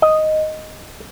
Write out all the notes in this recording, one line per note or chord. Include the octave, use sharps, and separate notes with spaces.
D#5